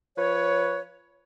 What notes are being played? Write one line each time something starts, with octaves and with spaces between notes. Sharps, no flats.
F3 B4 C#5